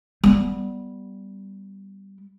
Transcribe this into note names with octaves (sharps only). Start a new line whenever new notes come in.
G3 B3